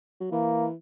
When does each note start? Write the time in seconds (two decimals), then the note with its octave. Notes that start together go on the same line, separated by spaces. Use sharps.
0.21 F#3
0.32 E3 A#3